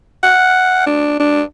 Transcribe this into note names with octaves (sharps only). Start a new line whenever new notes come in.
F#5
D4
D4